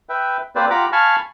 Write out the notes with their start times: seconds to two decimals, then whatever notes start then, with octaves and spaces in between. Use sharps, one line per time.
0.09 B4 E5 G5
0.56 A#3 C4 G4 B4 C5 D5
0.70 F4 G4 F#5 A#5 B5 D6
0.92 F5 G#5 A5 B5 C#6 F6